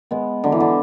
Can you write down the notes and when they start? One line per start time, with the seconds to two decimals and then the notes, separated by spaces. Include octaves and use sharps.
0.11 G#3 B3
0.44 D3 F#3
0.52 E3
0.60 D3